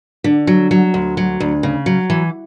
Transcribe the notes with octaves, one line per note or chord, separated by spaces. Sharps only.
D3
F#3
F#3
D2
F#3
D2
C#3
F#3
E3